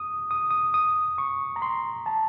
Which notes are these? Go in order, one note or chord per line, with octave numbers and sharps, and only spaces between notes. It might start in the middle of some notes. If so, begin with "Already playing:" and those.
Already playing: D#6
D#6
D#6
D#6
C#6
A#5
C6
A5